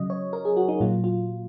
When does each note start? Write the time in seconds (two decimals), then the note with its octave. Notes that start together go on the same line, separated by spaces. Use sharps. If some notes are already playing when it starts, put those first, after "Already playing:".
Already playing: C#3 F#3 D#5
0.10 C#5
0.33 A#4
0.45 G#4
0.57 F#4
0.68 D#4
0.80 A#2 F#3 F4
1.04 F4